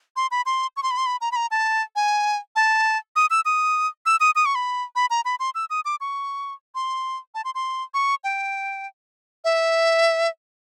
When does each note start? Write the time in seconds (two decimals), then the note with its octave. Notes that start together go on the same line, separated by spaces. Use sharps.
0.16 C6
0.31 B5
0.46 C6
0.77 C#6
0.83 C6
0.91 B5
0.97 C6
1.06 B5
1.21 A#5
1.32 B5
1.36 A#5
1.51 A5
1.96 G#5
2.56 A5
3.16 D#6
3.30 E6
3.45 D#6
4.06 E6
4.20 D#6
4.35 D#6
4.46 C#6
4.55 B5
4.96 B5
5.10 A#5
5.25 B5
5.40 C6
5.55 E6
5.70 D#6
5.85 D6
6.01 C#6
6.75 C6
7.35 A5
7.45 C6
7.55 C6
7.94 C#6
8.24 G5
9.45 E5